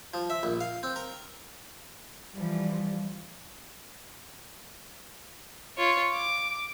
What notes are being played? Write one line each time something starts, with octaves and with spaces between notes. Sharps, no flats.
F3
E5
A#1
F5
C4
A#4
E3 F3 G3
F4 C#5
D6